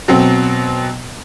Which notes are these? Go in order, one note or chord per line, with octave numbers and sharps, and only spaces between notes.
B2 F#3 C4